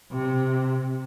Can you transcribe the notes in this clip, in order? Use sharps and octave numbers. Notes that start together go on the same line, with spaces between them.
C3